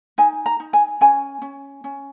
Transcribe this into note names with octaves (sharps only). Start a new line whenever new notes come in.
D#4 G#5
A#5
D#4
G#5
C#4 G#5
C#4
C#4